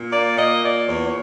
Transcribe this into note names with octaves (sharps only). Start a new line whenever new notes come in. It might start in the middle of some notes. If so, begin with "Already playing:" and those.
Already playing: A#2
A#3 D5
A#2 D#5
A#2 D5
E2 C#5
C#5